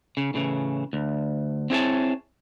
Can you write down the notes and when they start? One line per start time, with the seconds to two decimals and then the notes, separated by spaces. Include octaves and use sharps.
0.17 C#3
0.34 A2 C#3 E3
0.93 D2
1.70 C4 E4 G#4 A4 C#5 A5